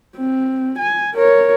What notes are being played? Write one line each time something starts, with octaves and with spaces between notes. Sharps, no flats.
C4
G#5
A#4 C#5